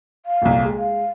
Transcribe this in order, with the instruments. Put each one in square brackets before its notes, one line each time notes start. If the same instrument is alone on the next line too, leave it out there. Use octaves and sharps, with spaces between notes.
[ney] F5
[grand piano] D#1 C2
G#3
[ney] F5